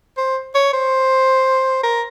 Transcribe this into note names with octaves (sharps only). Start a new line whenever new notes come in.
C5
C#5
C5
A#4